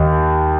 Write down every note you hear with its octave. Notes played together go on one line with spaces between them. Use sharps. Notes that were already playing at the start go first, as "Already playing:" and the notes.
Already playing: D#2